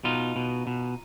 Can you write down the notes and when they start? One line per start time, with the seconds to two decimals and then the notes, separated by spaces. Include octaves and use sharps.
0.04 B2 D#4 F4
0.36 B2
0.67 B2